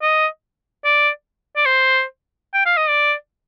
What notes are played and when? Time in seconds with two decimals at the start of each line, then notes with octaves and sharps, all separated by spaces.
0.02 D#5
0.85 D5
1.56 D5
1.66 C5
2.54 G5
2.66 F5
2.77 D#5
2.89 D5